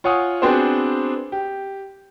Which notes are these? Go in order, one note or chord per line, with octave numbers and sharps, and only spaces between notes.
F4 C#5 F#5 G#5 D#6
B3 C4 D4 F#4 G#4 C5
G4